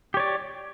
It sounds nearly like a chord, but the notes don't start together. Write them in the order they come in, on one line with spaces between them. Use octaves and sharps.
G4 C#5 D5